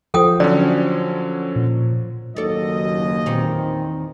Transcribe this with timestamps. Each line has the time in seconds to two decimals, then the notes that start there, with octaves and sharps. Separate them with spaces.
0.14 F3 F4 A4 C5 G5 D#6
0.40 D3 F#3 C#4 D5
1.56 A#2
2.36 F#1 D#2 F#3 A4 D5 D#5
3.26 E2 A#2 D#3 C4